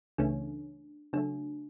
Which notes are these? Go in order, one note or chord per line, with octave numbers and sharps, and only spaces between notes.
C#2 C#3 E3 A3 C#4 D4
C#3 F#3 A3 D4